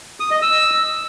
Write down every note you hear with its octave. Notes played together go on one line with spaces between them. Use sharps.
D#6
D#5
E6